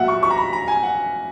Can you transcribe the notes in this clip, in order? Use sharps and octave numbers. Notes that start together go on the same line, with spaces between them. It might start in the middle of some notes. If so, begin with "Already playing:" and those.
Already playing: A#2 F#3 E5 F#5
C#6
C#6
A#5
B5
A#5
G#5
F#5